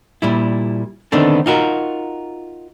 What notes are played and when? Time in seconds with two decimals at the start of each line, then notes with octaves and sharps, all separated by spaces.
0.22 A#2 G3 E4
1.12 D3 D#3 A3 B3 C4 D4
1.46 D#4 F4 F#4 A#4